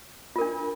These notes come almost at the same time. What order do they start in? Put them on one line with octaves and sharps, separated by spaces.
F4 A#4 D4